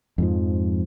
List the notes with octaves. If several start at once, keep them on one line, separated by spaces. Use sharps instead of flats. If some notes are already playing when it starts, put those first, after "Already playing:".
F2 G#2 F3